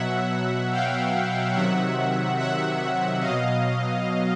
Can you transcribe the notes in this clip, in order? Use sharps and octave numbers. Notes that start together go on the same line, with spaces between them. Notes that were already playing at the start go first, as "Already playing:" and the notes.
Already playing: B2 F#3 E5 F#5
F5 G5
C3 D#3 F#3 E5 F#5
E5 F#5
B2 F#3 D#5 F5